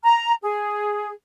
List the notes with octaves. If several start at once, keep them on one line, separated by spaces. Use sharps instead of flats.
A#5
G#4